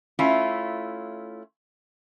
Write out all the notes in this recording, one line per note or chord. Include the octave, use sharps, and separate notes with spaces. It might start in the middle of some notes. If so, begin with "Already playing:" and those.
A3 C#4 E4 F4